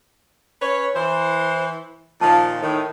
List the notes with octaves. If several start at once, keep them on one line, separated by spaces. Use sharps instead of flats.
C#4 B4 C#5
E3 C5
A#2 D#3 F3 A5
A2 D#3